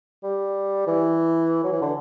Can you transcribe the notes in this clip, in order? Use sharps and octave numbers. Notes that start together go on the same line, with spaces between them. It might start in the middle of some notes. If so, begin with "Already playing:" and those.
G3
E3
F#3
E3
D3